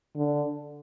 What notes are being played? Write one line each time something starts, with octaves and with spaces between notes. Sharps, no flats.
D3